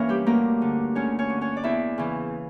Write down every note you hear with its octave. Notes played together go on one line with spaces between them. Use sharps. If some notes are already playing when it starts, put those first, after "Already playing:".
Already playing: G2 E3 A#3 C#4 A#4 C#5 E5
G3 G4
D2 A#3 A#4
D3
D2 C#4 C#5
C#4 C#5
D3
C#4 C#5
D5
E2 E4 E5
C#3 E3